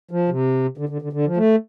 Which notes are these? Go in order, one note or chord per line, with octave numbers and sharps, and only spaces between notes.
F3
C3
D3
D3
D3
D3
F3
A3